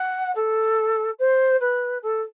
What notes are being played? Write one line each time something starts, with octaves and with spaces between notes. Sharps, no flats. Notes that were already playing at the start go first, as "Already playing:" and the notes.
Already playing: F#5
A4
C5
B4
A4